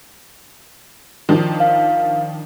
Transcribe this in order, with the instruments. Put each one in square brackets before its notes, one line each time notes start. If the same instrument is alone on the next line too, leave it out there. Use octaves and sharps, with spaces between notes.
[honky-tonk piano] D#3 F3 D4
[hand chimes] F5